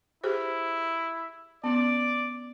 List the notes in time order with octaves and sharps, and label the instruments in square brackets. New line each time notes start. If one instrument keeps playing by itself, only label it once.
[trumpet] E4 [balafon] G4 G#4 C5
[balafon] B3 C#4 [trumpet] D5